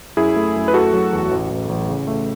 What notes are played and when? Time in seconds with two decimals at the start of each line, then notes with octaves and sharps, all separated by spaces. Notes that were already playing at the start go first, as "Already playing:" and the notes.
0.17 F#2 E4 G#4
0.36 A3
0.56 F#2
0.68 B4
0.74 A3 F#4 A4
0.93 F#3
1.13 E2
1.31 A1
1.50 A1
1.69 A1
1.89 C#3
2.07 A3